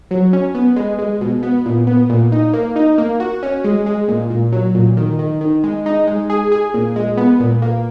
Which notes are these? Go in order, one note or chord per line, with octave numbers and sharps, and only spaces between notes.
F#3
C#4
B3
G#3
G#3
B2
B3
A#2
B3
A#2
D#4
A#3
D#4
A#3
F#4
C#4
G#3
G#3
A#2
A#2
F#3
A#2
D#3
D#3
D#3
G#3
D#4
G#3
G#4
G#4
A#2
G#3
B3
A#2
A#3